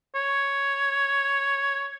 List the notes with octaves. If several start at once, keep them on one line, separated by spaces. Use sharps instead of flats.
C#5